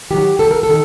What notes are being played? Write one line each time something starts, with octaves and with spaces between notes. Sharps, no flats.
D#3 F#3 G4
D#2 A4
A#4
A4
D#3